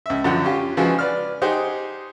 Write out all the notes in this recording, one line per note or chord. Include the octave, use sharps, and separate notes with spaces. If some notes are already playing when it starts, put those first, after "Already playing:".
C#2 E5
F#2 D3 F3 F#5
C#4 F4 G4
C#3 E3 F3 G#3 F4 F#4
B4 D5 F6
D#4 G4 G#4 C5 F#5